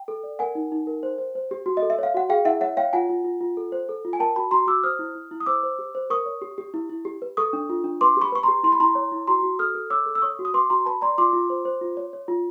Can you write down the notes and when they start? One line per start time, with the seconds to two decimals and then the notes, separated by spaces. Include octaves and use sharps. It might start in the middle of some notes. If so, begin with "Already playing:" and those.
Already playing: G5
0.08 A4
0.24 D5
0.39 A#4 F#5 G#5
0.55 D#4
0.72 D#4
0.87 A#4
1.03 C5
1.18 C5
1.35 C5
1.51 G4
1.66 F#4
1.77 D#5
1.82 A4
1.90 E5
1.98 C#5 F5
2.14 F#4 F#5
2.29 G#4 F5 G5
2.45 E4 E5 F#5
2.61 C#5 E5 F#5
2.77 C#5 F5 G5
2.93 F4 F#5 G#5
3.10 F4
3.24 F4
3.41 F4
3.57 A4
3.72 C5
3.89 A4
4.05 F4
4.13 G#5
4.19 A#4 G5 A5
4.36 F#4 A5 B5
4.51 F#4 A#5 C6
4.67 F#4 D6 E6
4.83 C5 D#6 F6
4.99 E4
5.15 E4
5.31 E4
5.40 D#6
5.46 C5 D6 E6
5.63 C5
5.79 G4
5.95 C5
6.10 A#4 C#6 D#6
6.26 C#5
6.41 G4
6.58 G4
6.74 E4
6.89 E4
7.05 G4
7.22 B4
7.37 A4 C#6 D#6
7.53 D4
7.70 F4
7.84 D4
8.01 B4 C6 D6
8.17 G4 B5 C#6
8.32 B4 C#6
8.43 G4 A#5 C6
8.63 E4 C6
8.72 B5
8.80 E4 A#5 C6
8.95 C#5
9.12 E4
9.27 F#4 A#5 C6
9.43 F#4
9.59 A4 D#6 F6
9.75 A4
9.90 C#5 D6 E6
10.06 A4
10.15 E6
10.22 C#5 C#6 D#6
10.39 F#4
10.45 D#6
10.54 B4 C6 D6
10.70 F#4 A#5 C6
10.85 B4 A5 B5
11.02 D5 A#5 C6
11.18 F4 C6 D6
11.33 F4
11.50 C5
11.65 C5
11.81 F4
11.97 C#5
12.13 C#5
12.28 F4